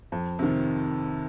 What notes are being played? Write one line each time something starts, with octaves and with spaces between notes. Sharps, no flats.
F2
C3 D#3